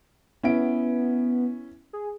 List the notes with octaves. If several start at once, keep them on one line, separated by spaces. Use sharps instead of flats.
B3 C#4 E4 D7
G#4